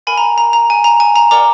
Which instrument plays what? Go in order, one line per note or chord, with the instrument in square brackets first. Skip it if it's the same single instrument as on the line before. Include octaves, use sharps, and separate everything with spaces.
[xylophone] A#4 F5 G#5 B5
A#5
A#5
A#5
G#5
A#5
G#5
A#5
A#4 D5 F#5 A#5 D6